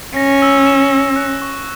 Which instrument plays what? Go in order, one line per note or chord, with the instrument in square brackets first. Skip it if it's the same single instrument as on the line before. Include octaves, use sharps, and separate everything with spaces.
[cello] C#4 [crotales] A#6
[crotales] E6
E7
E6
F#6
C#6